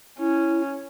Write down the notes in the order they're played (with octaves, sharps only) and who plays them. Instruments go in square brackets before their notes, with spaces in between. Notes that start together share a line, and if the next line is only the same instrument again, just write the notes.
[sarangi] C#4 [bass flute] E4